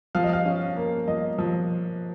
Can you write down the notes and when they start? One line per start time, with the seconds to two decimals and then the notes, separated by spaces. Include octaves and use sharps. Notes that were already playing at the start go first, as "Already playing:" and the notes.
0.15 F3 F5
0.24 D#5
0.33 F5
0.46 C#4
0.76 A#3
1.07 F3 D#5
1.38 F3